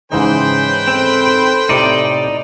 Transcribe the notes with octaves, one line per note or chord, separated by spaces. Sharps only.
G#2 C#3 E3 D#4 B4 C5 G5
C4 A4
A2 C3 D#4 D5 A5